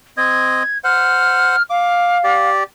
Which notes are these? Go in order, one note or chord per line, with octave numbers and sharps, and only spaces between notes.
C4 D#5 G#6
C5 F#5 F6
F5 D6
G4 D5